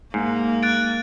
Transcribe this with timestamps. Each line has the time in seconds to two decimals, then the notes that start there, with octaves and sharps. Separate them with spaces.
0.14 G#2 A#3
0.63 F#6 A6 D7